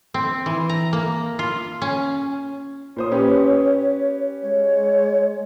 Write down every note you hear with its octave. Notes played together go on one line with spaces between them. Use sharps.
C4
E3
A#5
A#3
F4
C#4
A#2 C5 C#5 D#6
C#4 G4 B4
G#3 C#5